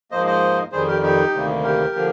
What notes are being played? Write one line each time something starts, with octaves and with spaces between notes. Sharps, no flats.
G#2 F3 A#3 C5 D#5
C5 D#5
F2 D#3 G3 G#4 C5
G4 A#4
D#4 G4
D2 C3 D#3 G3 A#3
G4 A#4
D3 F3 A#3